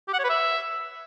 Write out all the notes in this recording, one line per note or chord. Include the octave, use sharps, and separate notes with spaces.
G4
F#5
C#5
B4
E5